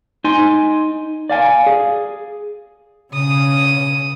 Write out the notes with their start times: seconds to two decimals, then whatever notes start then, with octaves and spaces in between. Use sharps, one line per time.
0.24 D#4 G#5 C6
1.29 D5 F5 G#5
1.66 G#4
3.14 C#3 D#6